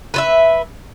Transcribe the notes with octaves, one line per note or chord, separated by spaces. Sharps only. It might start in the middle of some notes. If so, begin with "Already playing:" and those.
B4 C5 E5